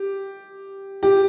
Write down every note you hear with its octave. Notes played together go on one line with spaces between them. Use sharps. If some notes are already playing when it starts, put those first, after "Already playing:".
Already playing: G4
G4